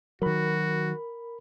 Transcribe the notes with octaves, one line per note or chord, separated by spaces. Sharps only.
D#3 F#3 F#4 A#4 B5